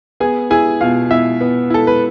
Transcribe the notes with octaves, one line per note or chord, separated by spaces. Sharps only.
B3 G#4 G#5
E4 G#4 G#5
B2 F4 F5
B2 E4 E5
B3
E4 A4
B4